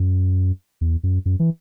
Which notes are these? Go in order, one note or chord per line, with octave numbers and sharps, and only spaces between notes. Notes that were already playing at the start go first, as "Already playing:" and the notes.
Already playing: F#2
E2
F#2
F#2
E3